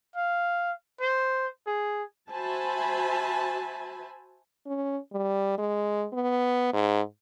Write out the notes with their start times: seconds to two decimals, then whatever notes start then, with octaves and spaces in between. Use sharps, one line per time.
0.16 F5
1.01 C5
1.67 G#4
2.30 F#4 C5 E5 G#5 A5 B5
4.66 C#4
5.12 G3
5.58 G#3
6.13 B3
6.73 G#2